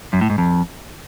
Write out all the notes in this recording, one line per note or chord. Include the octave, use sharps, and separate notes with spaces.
F#2
A2
G#2
F2